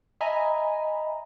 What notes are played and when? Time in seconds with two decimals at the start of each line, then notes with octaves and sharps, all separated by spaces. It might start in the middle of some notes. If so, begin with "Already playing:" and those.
0.21 D#5 E5 G#5 A#5 B5